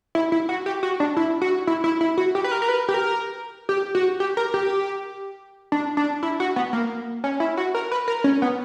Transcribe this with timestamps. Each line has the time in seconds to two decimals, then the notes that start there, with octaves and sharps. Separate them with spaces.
0.15 E4
0.32 E4
0.49 F#4
0.66 G4
0.83 F#4
1.00 D4
1.17 E4
1.42 F#4
1.67 E4
1.84 E4
2.01 E4
2.18 F#4
2.35 G4
2.44 B4
2.51 A#4
2.62 A#4
2.68 B4
2.89 G4
2.94 A#4
3.69 G4
3.95 F#4
4.20 G4
4.37 A#4
4.54 G4
5.72 D4
5.97 D4
6.23 E4
6.40 F#4
6.56 B3
6.73 A#3
7.24 C#4
7.40 E4
7.57 F#4
7.75 A#4
7.92 B4
8.08 A#4
8.24 C#4
8.42 B3